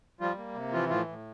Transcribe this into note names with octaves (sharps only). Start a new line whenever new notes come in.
F3 G3 F4
A#3
C3
E3 F3 F4
A2 F3 F4
A2